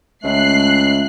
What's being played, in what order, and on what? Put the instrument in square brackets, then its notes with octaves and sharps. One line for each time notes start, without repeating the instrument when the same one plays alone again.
[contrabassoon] C#2 [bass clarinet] A3 [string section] F#6 C7